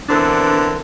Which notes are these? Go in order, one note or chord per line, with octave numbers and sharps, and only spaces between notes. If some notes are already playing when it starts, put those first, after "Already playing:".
B2 D3 E3 C4 D4 A#4